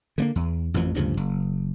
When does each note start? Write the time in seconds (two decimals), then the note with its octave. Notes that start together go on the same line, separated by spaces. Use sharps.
0.18 D3 A3 A#3
0.36 E2
0.74 A1 F2 E3 F3
0.96 D2 G2 C#3 F3
1.17 F#1